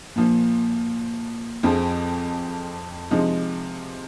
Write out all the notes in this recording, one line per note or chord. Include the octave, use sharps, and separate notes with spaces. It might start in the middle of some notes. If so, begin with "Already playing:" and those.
A#2 F3 A#3
F2 F3 C4 G#4
C3 F3 G#3 D#4